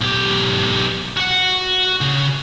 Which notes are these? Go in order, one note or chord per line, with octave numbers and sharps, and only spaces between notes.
B1 G4
F#4 F#5
C#3